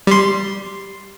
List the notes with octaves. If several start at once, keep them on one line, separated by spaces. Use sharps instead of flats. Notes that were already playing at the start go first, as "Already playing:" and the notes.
G3 C6